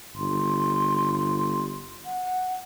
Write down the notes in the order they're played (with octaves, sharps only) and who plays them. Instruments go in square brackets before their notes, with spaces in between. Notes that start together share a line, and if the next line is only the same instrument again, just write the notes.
[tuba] G1 [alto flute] C6
[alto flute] F#5